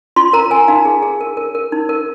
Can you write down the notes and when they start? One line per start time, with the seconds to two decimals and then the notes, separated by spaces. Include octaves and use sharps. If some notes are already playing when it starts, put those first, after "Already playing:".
0.16 F4 C6
0.33 A#4 A#5
0.51 A#4 G#5
0.68 D#4 F5
0.85 G#4
1.03 G#4
1.21 A#4
1.37 A#4
1.55 A#4
1.72 D#4
1.89 A#4